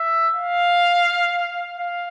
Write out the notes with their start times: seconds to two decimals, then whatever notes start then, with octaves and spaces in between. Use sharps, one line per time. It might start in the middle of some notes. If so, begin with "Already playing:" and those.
Already playing: E5
0.34 F5
1.78 F5